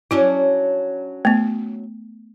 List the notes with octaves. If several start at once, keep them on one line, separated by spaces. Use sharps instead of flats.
F#3 C#4 D4 E4
A3 B3